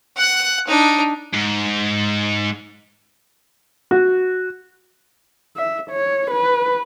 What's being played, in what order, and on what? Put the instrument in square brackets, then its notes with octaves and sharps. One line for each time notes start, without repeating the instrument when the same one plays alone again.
[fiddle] F#5 F#6
D4 D#4
[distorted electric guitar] G#2
[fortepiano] F#4
[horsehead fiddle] E5
C#5
B4